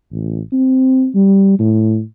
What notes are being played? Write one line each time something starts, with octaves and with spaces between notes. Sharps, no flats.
A1
C4
G3
A2